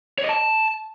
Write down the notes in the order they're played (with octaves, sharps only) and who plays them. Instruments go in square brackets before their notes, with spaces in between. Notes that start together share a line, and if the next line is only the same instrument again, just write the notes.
[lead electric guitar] C#5
D#5
A5